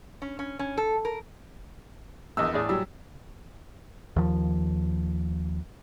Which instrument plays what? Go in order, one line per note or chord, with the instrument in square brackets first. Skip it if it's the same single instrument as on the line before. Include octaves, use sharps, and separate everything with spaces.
[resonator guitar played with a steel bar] C#4
C#4
C#4
A4
A#4
[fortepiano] A#1 D#5 [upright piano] E2 E6
[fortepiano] A2 G#4 D5
[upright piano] F#3 G3 E6
[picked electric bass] D#2 F3